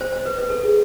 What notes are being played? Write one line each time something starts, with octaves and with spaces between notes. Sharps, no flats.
C5
C5
B4
B4
A4
G#4